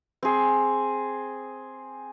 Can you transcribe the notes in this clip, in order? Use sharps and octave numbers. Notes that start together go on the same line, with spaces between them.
C4 G#4